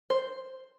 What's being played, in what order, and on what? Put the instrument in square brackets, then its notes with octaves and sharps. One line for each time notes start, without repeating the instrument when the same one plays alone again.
[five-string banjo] C5